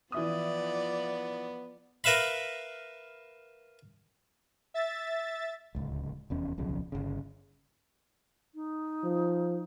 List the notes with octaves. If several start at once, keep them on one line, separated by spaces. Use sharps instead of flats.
E3 F3 B3 D5 E5 D#6
A#4 B4 E5 F5 B5
E5 A6
D1 C#2
F1 E2 C#4
D1 B1 C#3 F3
G1 C#3
D#4
F3